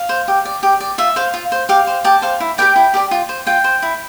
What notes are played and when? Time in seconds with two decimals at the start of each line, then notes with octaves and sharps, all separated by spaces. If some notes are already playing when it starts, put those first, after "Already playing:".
Already playing: F5
0.09 C5
0.28 G4
0.45 D5
0.63 G4
0.80 D5
0.98 F4 E5
1.16 C5 F5
1.34 F4
1.52 C5
1.69 G4 F5
1.87 C5
2.04 G4 A5
2.22 C5 F5
2.40 E4
2.58 G4 A#4 D5 G5
2.76 E4
2.94 G4 A#4 D5
3.11 F4
3.29 C5
3.46 F4 G5
3.64 C5
3.82 E4